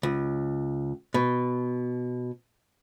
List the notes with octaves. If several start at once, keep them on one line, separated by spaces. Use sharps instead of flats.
C#2
B2